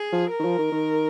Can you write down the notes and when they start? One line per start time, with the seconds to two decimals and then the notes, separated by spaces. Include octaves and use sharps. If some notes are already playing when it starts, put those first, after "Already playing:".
Already playing: G#4
0.12 F3
0.31 A#4
0.39 D#3
0.45 F3
0.58 D#3
0.72 D#3